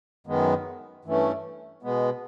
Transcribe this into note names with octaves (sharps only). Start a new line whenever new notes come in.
F#2 D#3 G#3 B3
G2 E3 A3 C#4
B2 G#3 B3